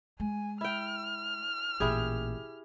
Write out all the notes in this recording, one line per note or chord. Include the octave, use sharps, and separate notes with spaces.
G#3 G#5
E4 G5 F6
A1 A#2 E4 G4 G#4